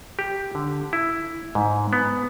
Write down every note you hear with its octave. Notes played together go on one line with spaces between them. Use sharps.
G4
D3
E4
G#2
B3